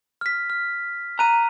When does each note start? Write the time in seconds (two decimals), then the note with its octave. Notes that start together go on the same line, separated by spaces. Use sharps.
0.21 F6 B6
0.50 F6
1.19 A#5 F#6 D#7